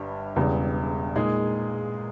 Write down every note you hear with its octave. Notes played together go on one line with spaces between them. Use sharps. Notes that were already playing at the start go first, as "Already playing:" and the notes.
Already playing: G1 G2 G3
E1 E2 C#3 G3
A#2 G#3 D#4 G#4